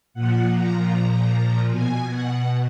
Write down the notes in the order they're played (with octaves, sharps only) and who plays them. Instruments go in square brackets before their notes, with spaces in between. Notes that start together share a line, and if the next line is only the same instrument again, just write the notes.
[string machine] A#2 F3 F#5
A#5
B2 G#5
F#5